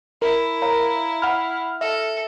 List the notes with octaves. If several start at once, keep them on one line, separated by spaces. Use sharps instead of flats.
E4 A#4
C#5 F5 A#5
F#5 B5 F6
A4 E5